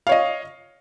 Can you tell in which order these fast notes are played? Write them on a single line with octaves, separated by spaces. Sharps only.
F5 C#5 D#5